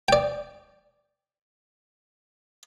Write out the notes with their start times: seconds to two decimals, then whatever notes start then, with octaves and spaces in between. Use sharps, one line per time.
0.08 D5 G5